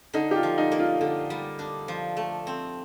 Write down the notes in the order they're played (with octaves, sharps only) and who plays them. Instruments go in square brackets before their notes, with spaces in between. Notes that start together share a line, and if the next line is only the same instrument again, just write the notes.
[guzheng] D3 [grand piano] D#4
[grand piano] G4
F4
[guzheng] F3
[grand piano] D#4
[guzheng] A#3
[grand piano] F4
[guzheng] D3
G3
D4
F3
A3
C4